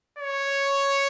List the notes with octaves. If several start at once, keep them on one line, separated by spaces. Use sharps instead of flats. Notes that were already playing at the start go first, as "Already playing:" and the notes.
C#5